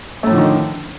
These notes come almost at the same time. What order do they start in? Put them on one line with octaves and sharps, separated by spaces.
A3 A2 F3 D3 D#3